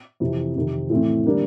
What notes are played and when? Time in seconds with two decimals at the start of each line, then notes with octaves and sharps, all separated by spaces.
0.20 F2 C3 E3
0.56 F2 C3 D#3
0.90 A2 E3 A3 C4
1.25 D3 G3 A#3 D4